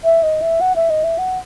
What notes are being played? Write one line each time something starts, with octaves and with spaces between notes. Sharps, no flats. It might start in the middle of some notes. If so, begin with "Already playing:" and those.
E5
D#5
E5
F#5
E5
D#5
E5
F#5